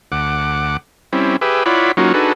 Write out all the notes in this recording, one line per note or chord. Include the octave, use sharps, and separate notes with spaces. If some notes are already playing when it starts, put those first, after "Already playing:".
D2 F#5 D6
G3 C4 C#4 E4
G4 G#4 B4 E5
E4 F4 C#5 D5 F#5 B5
F#3 A#3 C#4 D#4 F4 F#4
D4 D#4 F#4 G#4 A4 B4